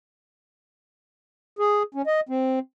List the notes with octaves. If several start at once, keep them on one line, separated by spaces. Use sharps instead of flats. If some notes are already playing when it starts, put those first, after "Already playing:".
G#4
C#4
D#5
C4